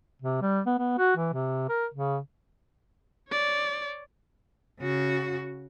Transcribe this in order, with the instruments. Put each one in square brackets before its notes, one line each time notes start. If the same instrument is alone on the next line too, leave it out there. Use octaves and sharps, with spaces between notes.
[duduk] C3
G3
B3
B3
F#4
E3
C3
A#4
C#3
[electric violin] C#5 D5
[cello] C#3 F#4